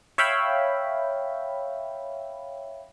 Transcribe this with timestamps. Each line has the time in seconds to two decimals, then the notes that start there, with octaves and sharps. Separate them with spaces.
0.18 C#5 E5 F5 G5 B5